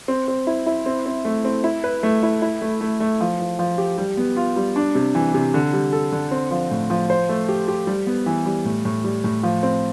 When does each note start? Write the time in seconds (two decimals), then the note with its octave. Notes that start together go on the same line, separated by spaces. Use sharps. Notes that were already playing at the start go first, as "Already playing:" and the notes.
0.08 C4
0.28 C4
0.47 E4
0.66 E4
0.86 C4
1.06 C4
1.25 A3
1.45 C4
1.64 E4
1.84 B4
2.03 A3
2.23 E4
2.42 E4
2.62 A3
2.81 A3
3.00 A3
3.21 F3
3.39 F3
3.59 F3
3.78 G4
3.98 G3
4.17 B3
4.37 F4
4.56 G3
4.76 D4
4.95 C3
5.15 E3
5.34 C3
5.54 D3
5.73 G3
5.93 A4
6.12 D3
6.31 C4
6.51 F3
6.71 A2
6.90 F3
7.10 C5
7.29 A3
7.49 G4
7.68 G4
7.87 G3
8.07 B3
8.26 E3
8.46 G3
8.65 A2
8.85 A2
9.04 G3
9.24 A2
9.43 F3
9.63 C4